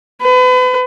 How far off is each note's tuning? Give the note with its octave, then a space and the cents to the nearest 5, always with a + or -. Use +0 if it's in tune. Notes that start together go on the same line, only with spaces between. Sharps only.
B4 +35